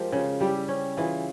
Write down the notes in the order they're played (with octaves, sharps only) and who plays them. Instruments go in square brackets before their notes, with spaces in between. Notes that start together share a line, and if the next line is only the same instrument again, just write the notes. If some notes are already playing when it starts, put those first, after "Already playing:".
Already playing: [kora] F3 G#3 [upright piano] F4 G4 G#4 A#4
[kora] C#3 [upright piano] F4 G#4
[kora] G3 [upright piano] E4 G4
[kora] C#4
[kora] E3 [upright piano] F4 G#4